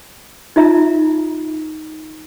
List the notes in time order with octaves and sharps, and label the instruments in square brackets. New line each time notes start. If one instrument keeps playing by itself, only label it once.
[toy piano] D#4 F4 E5 A#5